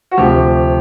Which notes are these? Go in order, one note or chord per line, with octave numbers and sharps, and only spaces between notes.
F#4
D2 C3 F3 G4